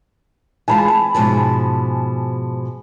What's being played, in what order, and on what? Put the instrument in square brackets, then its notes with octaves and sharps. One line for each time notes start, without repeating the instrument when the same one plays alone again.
[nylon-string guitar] E3 G#3 F4 [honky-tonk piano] G#5 A5 B5
[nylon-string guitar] C4
G#2 B2 F3